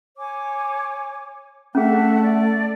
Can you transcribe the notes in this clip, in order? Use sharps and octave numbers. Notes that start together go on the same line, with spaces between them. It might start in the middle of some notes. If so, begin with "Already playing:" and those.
C#5 G#5 D6
A3 C#4 G#4 A4 E5 F#5
D5